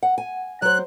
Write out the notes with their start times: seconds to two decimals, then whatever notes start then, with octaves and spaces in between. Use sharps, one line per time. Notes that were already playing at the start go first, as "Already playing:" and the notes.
0.03 F#5
0.18 G#5
0.62 F#3 C5 F#6